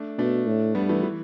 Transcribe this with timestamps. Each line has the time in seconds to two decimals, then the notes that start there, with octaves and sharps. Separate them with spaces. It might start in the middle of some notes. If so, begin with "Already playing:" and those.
Already playing: A3 D4
0.18 B2 A3 D4
0.47 A2
0.75 G2 G3 B3
0.89 E3 A3
1.03 E3